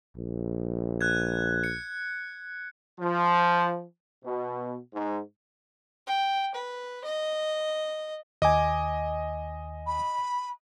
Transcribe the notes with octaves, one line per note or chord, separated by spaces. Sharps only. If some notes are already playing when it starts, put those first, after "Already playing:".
A#1
F#6 G#6
C#7
F3
B2
G#2
G5
B4
D#5
D#2 D#5 G#5 D6
B5